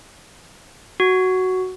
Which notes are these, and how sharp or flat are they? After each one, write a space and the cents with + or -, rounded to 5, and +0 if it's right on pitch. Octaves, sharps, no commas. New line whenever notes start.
F#4 +5